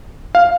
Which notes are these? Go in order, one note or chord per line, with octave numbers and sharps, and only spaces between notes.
F5